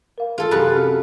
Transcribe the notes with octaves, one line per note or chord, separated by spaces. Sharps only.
A#4 F5
F4 G#4 A4
F#2 C3 G4 B4
C4 G4 F6